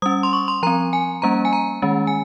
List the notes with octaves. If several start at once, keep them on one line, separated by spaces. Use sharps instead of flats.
G3 C#4 D#6
C6
C#6
C6
F3 C4 A#5
G#5
G3 A#3 C#4 A#5
G#5
A#5
D#3 G#3 C#4
G#5